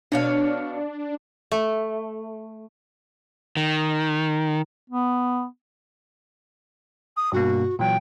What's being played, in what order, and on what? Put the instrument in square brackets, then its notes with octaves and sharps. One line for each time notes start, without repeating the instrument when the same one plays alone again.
[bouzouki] B2 C#5 F5 [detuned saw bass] D4
[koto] A3
[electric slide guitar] D#3
[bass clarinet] B3
[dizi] D#6
[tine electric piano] G2 B2 A#3 [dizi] F#4
[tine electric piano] A#2 E3 F#3 [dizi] G5